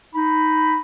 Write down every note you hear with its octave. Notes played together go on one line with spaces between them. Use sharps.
D#4 B5